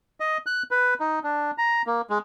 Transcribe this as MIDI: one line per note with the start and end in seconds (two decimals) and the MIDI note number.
0.20 0.38 75
0.46 0.63 90
0.71 0.94 71
1.00 1.19 63
1.24 1.51 62
1.58 1.82 82
1.86 2.01 58
2.10 2.18 56